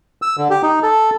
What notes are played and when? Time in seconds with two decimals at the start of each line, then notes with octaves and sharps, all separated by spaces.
0.22 E6
0.38 D3
0.50 G4
0.63 D#4
0.83 A4